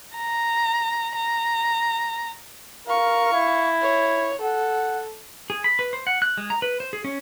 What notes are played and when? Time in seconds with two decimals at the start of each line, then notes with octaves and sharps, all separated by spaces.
0.17 A#5
1.16 A#5
2.88 A#4 F5 C#6
3.33 E4
3.82 C#5
4.42 A4 F#5
5.50 G#4
5.64 B5
5.79 B4
5.93 C5
6.07 F#5
6.22 F#6
6.37 G#3
6.50 A#5
6.62 B4
6.80 C5
6.93 G#4
7.04 C#4